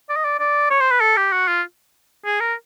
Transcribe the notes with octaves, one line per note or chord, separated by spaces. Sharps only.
D5
D#5
D5
D5
C#5
C5
B4
A4
G4
F#4
F4
G#4
A#4